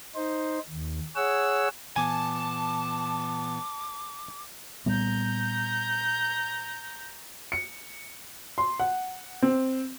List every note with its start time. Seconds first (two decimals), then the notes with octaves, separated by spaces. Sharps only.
0.15 D#4 C5
0.70 D#2
1.16 G#4 C#5 F#5 E6
1.96 A#2 E3 B3 G#5 A5 D6
4.86 A#2 G3 B3 A#5 G6
7.52 C#7
8.58 C6
8.80 F#5
9.42 C4